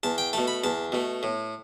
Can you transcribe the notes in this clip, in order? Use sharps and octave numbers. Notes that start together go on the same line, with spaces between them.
E2 A5
G5
B2 A3 A5
B5
E2 A5
B2 A3
A2